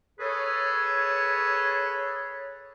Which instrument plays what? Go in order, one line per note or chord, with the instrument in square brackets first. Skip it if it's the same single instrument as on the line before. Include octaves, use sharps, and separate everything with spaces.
[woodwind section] G#4 A4 B4 C#5